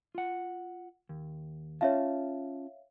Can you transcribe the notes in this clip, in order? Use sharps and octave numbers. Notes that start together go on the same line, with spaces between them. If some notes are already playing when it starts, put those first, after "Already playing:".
F4 F#5
D#2
C#4 F4 C#5 E5 F5 A5